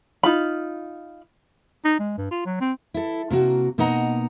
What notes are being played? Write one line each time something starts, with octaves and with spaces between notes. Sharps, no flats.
D#4 F4 B5
D#4
G#3
G2
F4
F#3
C4
E4 A4
C3 A#3 F#4
B2 A#3 D#4 D#5 F#5 A#5